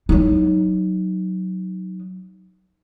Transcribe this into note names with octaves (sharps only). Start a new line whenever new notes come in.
F#3 D#4